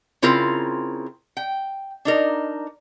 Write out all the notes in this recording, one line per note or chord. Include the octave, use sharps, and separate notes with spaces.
C#3 C4 E4 F4 A#4
G5
D4 D#4 A#4